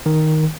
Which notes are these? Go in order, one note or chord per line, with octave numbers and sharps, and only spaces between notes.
D#3